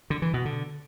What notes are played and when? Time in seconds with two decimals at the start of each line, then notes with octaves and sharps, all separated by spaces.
0.10 D3
0.22 E3
0.34 B2
0.45 D3